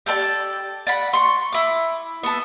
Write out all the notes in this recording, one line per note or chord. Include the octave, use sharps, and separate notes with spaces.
G4 A4 B4 D5
D5 F#5 B5
C6 C#6
E4 D6
B3 A4